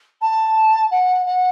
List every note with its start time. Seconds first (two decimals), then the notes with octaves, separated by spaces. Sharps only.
0.21 A5
0.91 F#5
1.26 F#5